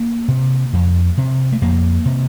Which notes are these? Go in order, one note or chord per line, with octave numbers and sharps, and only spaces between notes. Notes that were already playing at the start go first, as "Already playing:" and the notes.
Already playing: A#3
C3
F2
C3
A3
F2 A#3
C3